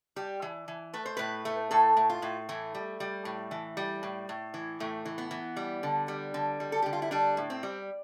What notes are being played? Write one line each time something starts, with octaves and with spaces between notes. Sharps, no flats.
G3 G4
E3
E3
A3 B4
C5
A2 B4
A3
A2 A4
A2
F4
A2
E3 A3
G3
G3
A2
E3
G3
A2
A2
E3
A2 A3
E3
B3
E3
G3
D3
G3
D3
G3
A4
D3 G4
F4
E4
G3 D4
A2
C4
G3